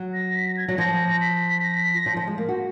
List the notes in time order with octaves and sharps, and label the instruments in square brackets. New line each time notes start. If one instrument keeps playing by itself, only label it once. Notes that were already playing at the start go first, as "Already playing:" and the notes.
Already playing: [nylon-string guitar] F#3
[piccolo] A#6
B6
A#6
G#6
[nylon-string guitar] F#3 [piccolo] A#6
[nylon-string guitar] F3 [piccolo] A#6
[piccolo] B6
A#6
B6
B6
A#6
[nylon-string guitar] F3
F3
G#3
A#3
F#4